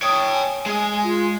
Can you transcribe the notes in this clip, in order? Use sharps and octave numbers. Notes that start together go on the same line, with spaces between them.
C#5 G5 D#6
G#5
G#3 D#5
F4